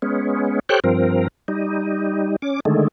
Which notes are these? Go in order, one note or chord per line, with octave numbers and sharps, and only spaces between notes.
G#3 B3 C#4
G4 A4 C5 C#5 G5 F#6
G2 F3 C4 A#4
G3 D#4
C#4 D6
D3 D#3 G#3 A3